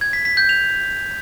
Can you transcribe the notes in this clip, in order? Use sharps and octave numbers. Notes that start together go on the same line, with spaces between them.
G#6
B6
B6
G6
F7